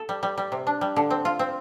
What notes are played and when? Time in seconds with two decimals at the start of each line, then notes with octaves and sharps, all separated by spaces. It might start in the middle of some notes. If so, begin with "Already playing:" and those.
Already playing: A4
0.09 G3
0.23 G3
0.38 G3
0.52 C3
0.67 D4
0.81 G3
0.96 D3
1.10 C4
1.25 F4
1.39 C4